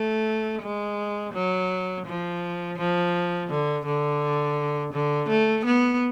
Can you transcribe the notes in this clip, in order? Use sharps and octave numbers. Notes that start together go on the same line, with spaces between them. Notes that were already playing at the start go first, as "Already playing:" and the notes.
Already playing: A3
G#3
F#3
F3
F3
D3
D3
D3
A3
B3